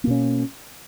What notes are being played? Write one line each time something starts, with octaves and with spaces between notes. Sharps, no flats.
B2 A#3 C#4